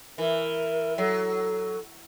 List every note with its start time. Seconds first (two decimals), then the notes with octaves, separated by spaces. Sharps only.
0.18 E3 A#4
0.98 F#3 A4